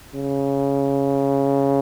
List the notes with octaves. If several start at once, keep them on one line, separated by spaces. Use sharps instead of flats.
C#3